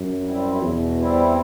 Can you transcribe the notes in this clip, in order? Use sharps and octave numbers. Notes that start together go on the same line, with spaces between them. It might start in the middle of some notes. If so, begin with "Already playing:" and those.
Already playing: F#2
G3 C4 E4
E2 B2
G3 C4 E4